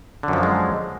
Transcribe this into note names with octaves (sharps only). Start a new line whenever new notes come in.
F#2 D3 F3 F#3 G#3